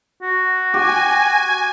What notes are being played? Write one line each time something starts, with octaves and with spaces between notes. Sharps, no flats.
F#4
G4 G#5